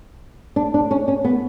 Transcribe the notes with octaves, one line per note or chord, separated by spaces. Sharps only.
D4
D4
C#4
C#4
B3